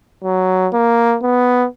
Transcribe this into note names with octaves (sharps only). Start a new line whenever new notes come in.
F#3
A#3
B3